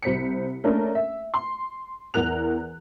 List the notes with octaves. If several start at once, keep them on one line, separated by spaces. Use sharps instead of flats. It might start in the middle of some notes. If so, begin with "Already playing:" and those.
C2 C5 B6 C#7
A3 A#3 C#4 D4 A#4
E5
C6
E2 E3 A#4 F#6 F7